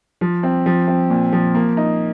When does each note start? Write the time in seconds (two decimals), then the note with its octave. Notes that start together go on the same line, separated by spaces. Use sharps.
0.21 F3
0.43 C4
0.66 F3
0.87 C4
1.10 A#2
1.32 F3
1.55 A#3
1.77 D#4